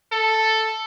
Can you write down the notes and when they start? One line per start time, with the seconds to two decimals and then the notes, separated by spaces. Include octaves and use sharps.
0.12 A4